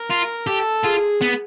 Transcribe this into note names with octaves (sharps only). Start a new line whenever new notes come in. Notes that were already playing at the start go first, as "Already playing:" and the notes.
Already playing: A#4
F4
G4 A4
F4 G#4
B3